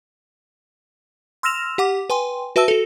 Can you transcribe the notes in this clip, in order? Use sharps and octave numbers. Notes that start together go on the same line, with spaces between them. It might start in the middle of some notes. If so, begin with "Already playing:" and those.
C6 E6 F6 A#6 E7 F7
G4 F#5 D6
B4 G5 G#5 C6
F#4 B4 E5 A5 E6
F#4 A4